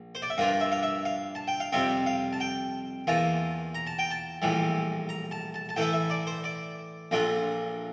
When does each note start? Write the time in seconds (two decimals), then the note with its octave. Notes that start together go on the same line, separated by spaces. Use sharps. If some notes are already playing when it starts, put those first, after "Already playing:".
Already playing: A#1
0.15 C5
0.22 D5
0.30 E5
0.38 G2 F3 A#3 D4 F4 F5
0.61 E5
0.72 F5
0.83 E5
1.05 F5
1.35 A5
1.48 G5
1.60 F5
1.72 F2 C3 G3 C4 F4 E5
2.06 F5
2.33 A5
2.40 G5
3.07 E2 E3 A#3 F4 A5
3.75 A#5
3.87 A5
3.99 G5
4.11 A5
4.42 A#1 A2 E3 G3
5.09 A#5
5.31 A5
5.54 A5
5.69 A5
5.76 A2 E3 A3 E4 G5
5.93 E5
6.10 D5
6.27 C5
6.44 D5
7.11 A#1 A#2 A3 D4 F4